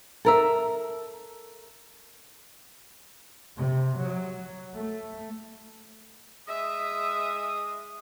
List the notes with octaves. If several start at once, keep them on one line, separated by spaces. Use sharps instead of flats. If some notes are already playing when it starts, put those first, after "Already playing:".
A4 A#4 E5
C3
F#3
A3
G#3 E5 D#6